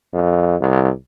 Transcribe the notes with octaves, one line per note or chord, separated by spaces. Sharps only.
F2
C2